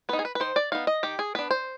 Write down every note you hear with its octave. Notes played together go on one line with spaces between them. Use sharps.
B3 D#4 B4
G#4
B4
B4
D#3 C5
D5
B3 D#4 F5
D#5
D#3 G4
G#4
B3 D4 B4
C5